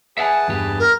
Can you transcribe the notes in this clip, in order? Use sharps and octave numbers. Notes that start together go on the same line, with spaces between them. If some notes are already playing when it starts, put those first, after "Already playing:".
G#4 B4 E5 F#5 G#5 A5
E2 G2 G4
A#4